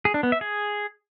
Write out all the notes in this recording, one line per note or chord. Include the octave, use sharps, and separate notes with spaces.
G#4
D4
B3
E5
G#4